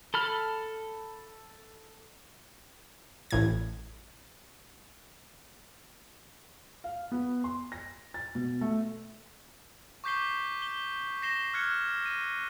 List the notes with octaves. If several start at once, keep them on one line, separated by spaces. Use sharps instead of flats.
A4 B5 F6
A1 A2 G#6
F5
B3
C6
A#6
A6
B2
A3
C#6 D6 G6 B6 C7 G7
G7
A#6 C7 E7 G7
F6 F#6 G#6 C#7
D#7